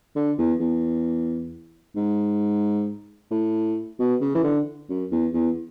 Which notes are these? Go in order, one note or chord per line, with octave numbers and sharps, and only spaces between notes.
D3
E2
E2
G#2
A2
B2
C#3
E3
D3
F#2
E2
E2